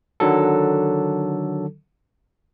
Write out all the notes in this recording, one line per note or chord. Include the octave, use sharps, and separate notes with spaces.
D3 D#3 F#3 A4